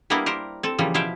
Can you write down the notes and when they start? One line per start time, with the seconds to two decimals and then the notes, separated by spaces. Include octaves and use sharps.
0.10 G3 A#3 B3 D4 E4 A#4
0.26 G4 A#4 C5
0.63 C4 A4
0.78 C#3 E3 F3 G3 A#3
0.94 B2 F3 E4 E5 F5 G5